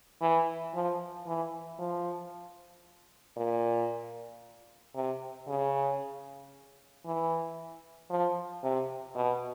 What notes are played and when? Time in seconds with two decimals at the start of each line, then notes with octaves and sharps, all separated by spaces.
0.21 E3
0.74 F3
1.27 E3
1.79 F3
3.37 A#2
4.95 C3
5.48 C#3
7.06 E3
8.10 F3
8.64 C3
9.15 B2